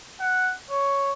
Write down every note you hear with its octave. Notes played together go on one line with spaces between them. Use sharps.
F#5
C#5